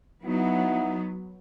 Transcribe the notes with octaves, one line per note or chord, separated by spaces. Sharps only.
F#3 B3 D#4 E4 F#5